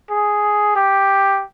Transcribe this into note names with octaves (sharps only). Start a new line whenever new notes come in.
G#4
G4